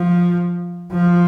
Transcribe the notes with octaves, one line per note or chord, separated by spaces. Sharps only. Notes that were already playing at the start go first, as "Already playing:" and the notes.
Already playing: F3
F3